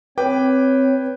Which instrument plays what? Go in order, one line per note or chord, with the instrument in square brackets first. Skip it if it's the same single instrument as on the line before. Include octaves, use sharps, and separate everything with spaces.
[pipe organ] C4 C#5 [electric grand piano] B4 G5 D6